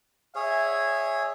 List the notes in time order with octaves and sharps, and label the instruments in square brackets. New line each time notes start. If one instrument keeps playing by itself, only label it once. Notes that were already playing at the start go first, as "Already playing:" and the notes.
[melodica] G#4 C#5 [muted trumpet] E5